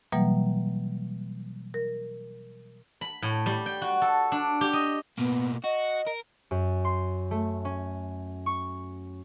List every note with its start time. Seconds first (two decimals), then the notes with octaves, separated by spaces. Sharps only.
0.12 B2 E3 F#3 G3 A#3
1.74 A#4
3.01 B5
3.22 A2
3.46 G3
3.66 G5
3.82 F#4
4.02 A4
4.32 D4
4.61 G4
4.73 D#5
5.18 B2 A#3 B3
5.64 F#4 D#5
6.07 A#4
6.51 F#2
6.85 C6
7.31 A3
7.65 C#4
8.46 C#6